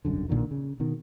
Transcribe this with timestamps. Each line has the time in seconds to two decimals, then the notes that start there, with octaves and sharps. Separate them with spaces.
0.05 E1 C2 F#2 D3
0.29 B1 A#2 D3 D#3
0.51 C#3
0.80 B2 D#3